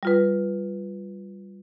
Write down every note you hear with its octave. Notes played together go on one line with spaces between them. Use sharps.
G3 F4 B4